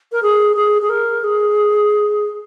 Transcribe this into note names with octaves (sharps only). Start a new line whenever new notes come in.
A#4
G#4
G#4
G#4
A#4
G#4